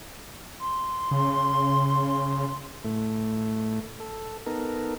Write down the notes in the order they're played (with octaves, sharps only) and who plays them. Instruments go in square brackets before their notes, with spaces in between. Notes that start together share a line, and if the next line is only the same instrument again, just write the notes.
[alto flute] C6
[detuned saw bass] C#3
[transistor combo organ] A2 A3
A4
B3 D#4 A4 A#4